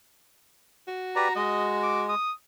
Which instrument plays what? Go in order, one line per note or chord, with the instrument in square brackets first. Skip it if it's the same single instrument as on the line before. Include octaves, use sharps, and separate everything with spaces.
[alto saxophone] F#4
[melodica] G4 B4 D5 [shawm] A#5
[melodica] G#3 [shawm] D#5
[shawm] D6
D#6